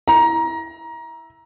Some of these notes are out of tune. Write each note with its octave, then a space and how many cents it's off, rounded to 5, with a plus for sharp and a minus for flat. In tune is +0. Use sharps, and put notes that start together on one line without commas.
E4 +0 A#5 +20